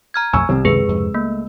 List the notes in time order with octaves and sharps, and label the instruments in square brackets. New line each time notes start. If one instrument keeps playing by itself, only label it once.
[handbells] A#5 F6 G#6
[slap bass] B1 F2 A3 [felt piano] G#5 C#6 E6
[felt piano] C2 [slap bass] C4
[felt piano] C#2 [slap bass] F#2 C3 D#3 [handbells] G#4 B4
[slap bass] F2 G#2 C3
[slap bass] A3 [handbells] A#3